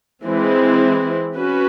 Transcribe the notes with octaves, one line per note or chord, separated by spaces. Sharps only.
E3 G#3 C4 E4
C#4 F#4 B4